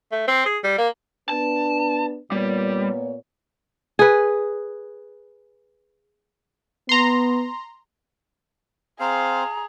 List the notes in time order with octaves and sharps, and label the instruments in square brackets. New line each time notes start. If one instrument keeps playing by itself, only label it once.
[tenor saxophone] A3
C4
G#4
G3
A#3
[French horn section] B3 D4 B4 [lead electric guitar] A5
[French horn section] A#2 B3 C#5 [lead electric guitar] G3
[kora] G#4 B4
[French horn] B3 [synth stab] A#5 C6
[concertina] C4 C5 [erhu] G#4 [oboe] F5 [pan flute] A#5